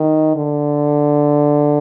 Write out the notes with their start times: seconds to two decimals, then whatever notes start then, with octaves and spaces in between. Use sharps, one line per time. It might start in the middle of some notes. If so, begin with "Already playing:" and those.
Already playing: D#3
0.36 D3